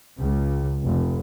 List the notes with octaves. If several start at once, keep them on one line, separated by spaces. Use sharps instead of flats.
C#2
F1